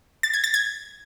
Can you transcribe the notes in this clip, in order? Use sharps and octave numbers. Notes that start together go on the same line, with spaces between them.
A6
G#6
A6
G#6